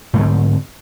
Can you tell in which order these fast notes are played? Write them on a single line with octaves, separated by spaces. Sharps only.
G#2 A3 D3 C4